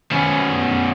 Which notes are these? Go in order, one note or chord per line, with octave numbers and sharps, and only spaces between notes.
B2 C#4